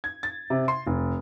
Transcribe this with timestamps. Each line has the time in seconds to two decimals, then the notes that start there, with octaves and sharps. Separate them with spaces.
0.04 G#6
0.23 A6
0.50 C3
0.68 C6
0.87 F1